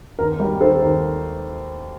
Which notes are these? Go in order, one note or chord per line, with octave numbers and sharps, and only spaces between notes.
D#2 A#4
G3 A#4
D#3 A4 C5
D#2 A#4